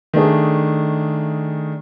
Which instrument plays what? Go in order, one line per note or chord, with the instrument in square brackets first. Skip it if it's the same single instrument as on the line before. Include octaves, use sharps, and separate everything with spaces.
[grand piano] D#3 A3 D4 G#4